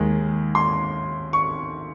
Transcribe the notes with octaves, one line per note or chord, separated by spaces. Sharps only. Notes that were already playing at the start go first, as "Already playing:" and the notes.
Already playing: D#2 D#3 G#3
C6
C#6